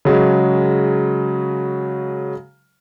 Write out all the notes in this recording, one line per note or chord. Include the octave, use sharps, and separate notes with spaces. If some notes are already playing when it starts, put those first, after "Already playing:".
C#3 F#3 G#3